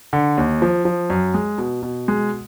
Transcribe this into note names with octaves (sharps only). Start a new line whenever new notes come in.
D3
D#2
F3
F3
F#2
G#3
B2
B2
G#3